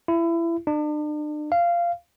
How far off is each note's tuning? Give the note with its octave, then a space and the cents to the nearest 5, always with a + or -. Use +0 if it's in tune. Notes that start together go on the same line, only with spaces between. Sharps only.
E4 +25
D4 +40
F5 -15